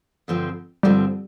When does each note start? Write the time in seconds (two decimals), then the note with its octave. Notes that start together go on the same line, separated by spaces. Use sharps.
0.28 G2 D3 F3 C4
0.83 G2 D3 F3 G3 C4